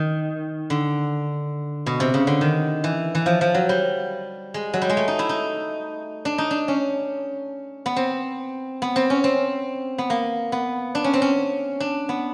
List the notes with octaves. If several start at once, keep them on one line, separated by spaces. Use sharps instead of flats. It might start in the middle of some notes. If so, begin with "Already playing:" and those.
Already playing: D#3
D3
B2
C3
C#3
D3
D#3
E3
E3
F3
F3
F#3
G3
G#3
F#3
G3
G#3
A3
D#4
E4
D#4
D4
D#4
D4
C#4
B3
C4
B3
C4
C#4
C4
B3
A#3
B3
D4
C#4
C4
C#4
D4
B3